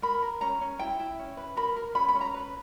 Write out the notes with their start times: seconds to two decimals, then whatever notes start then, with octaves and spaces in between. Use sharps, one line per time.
0.02 A#4 B5
0.22 A#4
0.41 C#4 A#5
0.61 C#4
0.79 E4 G5
0.99 E4
1.19 C#4
1.37 B4
1.56 A#4 B5
1.76 A#4
1.95 C#4 B5
2.09 B5
2.15 C#4
2.21 A#5
2.34 B4